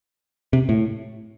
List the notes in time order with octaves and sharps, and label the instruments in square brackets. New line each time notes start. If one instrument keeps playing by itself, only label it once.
[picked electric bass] C3
A2